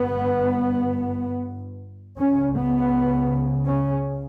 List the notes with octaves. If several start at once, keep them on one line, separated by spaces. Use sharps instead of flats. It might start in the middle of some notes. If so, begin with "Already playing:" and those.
Already playing: G1 G2 B3
C#2 C#3 C#4
B3
C#4